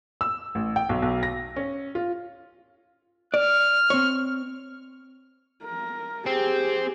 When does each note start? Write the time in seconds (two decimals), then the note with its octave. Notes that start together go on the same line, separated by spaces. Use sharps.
0.21 E6
0.55 A1
0.76 G5
0.89 B1
1.02 B1
1.23 A#6
1.56 C#4
1.95 F4
3.34 D5 F6
3.90 C4 C#5
5.64 A#4
6.26 C4 G4 G#4